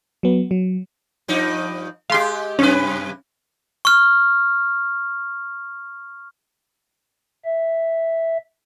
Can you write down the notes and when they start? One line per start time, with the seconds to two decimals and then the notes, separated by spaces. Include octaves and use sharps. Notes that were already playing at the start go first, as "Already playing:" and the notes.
0.23 F#3 B3
0.51 F#3
1.28 G2 F3 D#4
2.10 G#3 G4 F5 C6
2.59 F#2 C3 C#4 B4
3.85 C#6 F6
7.45 E5